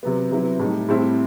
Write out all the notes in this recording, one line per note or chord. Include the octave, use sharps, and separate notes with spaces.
C3 F#3 B3
C3 F#3 B3 E4
A2 G3 D#4
A2 G3 C4 E4